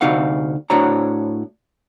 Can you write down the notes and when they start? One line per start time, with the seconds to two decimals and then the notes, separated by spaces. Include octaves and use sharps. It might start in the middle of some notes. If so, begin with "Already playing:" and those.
0.01 D2 C3 D#4 F#4 F5 F#5
0.70 A2 D4 F#4 C5 C#5 A#5